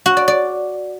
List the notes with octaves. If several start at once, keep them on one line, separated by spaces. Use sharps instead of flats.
F#4
D5
D5